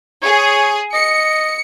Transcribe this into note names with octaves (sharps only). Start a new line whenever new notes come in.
G#4 C#5
D#5 C#7